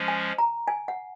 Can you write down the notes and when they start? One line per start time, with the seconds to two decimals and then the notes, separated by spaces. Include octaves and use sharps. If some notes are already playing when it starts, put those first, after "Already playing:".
Already playing: F3 G#3 C#4
0.08 G#5
0.38 A#5
0.68 G#5
0.88 F#5